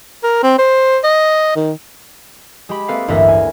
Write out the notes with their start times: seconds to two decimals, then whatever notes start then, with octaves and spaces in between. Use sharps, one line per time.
0.23 A#4
0.43 C4
0.58 C5
1.04 D#5
1.56 D#3
2.69 G#3 G4 B5
2.88 A#3 C4 A4 B4 F5
3.08 A1 D2 G2 A#4 B4 E5
3.28 G#5